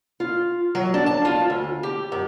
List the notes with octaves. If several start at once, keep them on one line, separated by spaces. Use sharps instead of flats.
F4
F#3
D4
A5
F4
D2
G4
F#2